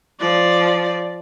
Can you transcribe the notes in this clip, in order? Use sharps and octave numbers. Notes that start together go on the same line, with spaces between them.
F3 D5